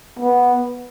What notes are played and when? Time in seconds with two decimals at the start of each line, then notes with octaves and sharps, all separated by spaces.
0.19 B3